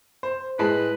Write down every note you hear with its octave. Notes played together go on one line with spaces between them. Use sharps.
C5
A2 G#3 B4 A5